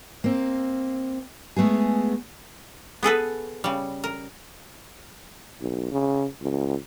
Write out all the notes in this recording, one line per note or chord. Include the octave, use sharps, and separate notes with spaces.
A#3 C4
G#3 A3 B3 G#4
B3 G#4 A4 B4
C#3 G3
A#4
B1
C#3
C#2